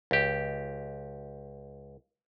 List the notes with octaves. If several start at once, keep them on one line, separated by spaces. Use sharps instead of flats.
C#2 G4